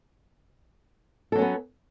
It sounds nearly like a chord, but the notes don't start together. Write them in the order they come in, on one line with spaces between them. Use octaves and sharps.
A4 F#3 C#4 B3